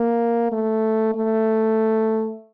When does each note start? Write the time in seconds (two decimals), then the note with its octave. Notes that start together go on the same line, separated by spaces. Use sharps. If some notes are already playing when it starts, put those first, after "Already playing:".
Already playing: A#3
0.52 A3
1.15 A3